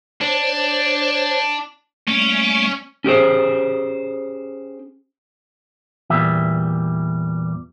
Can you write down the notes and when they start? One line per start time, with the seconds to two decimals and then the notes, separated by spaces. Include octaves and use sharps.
0.21 D4 C5 C#5
2.07 G3 A3 A#3 C#4
3.04 C#4 G4 G#4 C5
6.10 E2 A#2 G3 E5